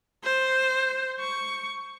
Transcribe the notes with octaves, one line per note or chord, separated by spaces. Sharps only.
C5
C#6